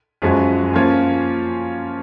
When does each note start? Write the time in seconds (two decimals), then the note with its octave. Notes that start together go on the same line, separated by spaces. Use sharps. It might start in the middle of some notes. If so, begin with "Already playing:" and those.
0.22 F#2 F3 G#3 C#4 F#4
0.73 F3 A#3 C#4 F4